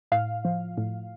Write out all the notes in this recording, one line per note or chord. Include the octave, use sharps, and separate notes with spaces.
A2 F5
F3
A2